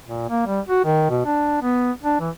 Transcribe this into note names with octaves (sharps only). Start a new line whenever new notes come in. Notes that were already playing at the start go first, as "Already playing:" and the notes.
A#2
A#3
G3
F#4
D#3
B2
D4
B3
D4
E3